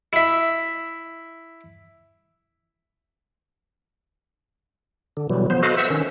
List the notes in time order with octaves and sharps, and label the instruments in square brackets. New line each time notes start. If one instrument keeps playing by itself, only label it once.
[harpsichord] E4 E5
[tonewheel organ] D3
B2 E3 F#3 G3
F3 B3 C5
F#4 A4 B4 C5 D#5 F5
C5 E5 F#5 E6
D#3 C#4